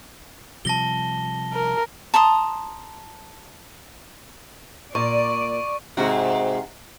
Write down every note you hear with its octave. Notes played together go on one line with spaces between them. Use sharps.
C3 F3 G3 A5 A#6 G7
A#4
A5 A#5 C6 D#6
A#2 D5 C#6
G#2 C3 F#4